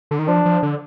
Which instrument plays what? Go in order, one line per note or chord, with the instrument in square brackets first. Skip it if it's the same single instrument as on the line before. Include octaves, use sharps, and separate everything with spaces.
[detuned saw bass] D3
D#3
[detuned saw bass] F3 [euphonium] D4
[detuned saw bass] F3
D3